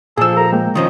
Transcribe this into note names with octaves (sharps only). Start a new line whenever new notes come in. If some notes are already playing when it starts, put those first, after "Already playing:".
A#2 F3 G#4 A4 E6
G4 A4 A#4 A#5
G#3 A#3 G5
D#3 F3 C#4 D#5